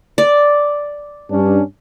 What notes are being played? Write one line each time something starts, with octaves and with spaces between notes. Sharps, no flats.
D5
G2 C#4 D4